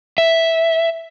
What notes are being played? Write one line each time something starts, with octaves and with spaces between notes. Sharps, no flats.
E5